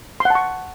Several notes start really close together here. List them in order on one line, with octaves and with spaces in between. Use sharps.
C6 F#5 A5 C#6